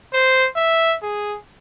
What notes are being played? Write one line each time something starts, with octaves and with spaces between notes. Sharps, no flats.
C5
E5
G#4